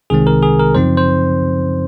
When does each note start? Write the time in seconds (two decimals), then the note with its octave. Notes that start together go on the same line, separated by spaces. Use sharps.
0.10 C2 C3 D#3 G#3 C4 G#4
0.27 A#4
0.43 G#4
0.59 A#4
0.75 F#2 C#3 F3 C4 D#4 C5
0.97 C5